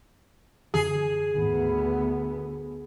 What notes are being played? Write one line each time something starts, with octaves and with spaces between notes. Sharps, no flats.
F#2 D3 E3 G#4
D2 G#2 D#3 B3